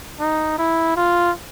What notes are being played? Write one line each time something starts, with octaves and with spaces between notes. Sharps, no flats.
D#4
E4
F4